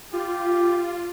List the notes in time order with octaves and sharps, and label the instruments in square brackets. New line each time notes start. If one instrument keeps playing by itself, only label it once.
[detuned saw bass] F4 [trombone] G4